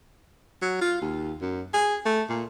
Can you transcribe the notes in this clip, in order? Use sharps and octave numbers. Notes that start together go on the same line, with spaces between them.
F#3
F4
D#2
F#2
G#4
A3
A#2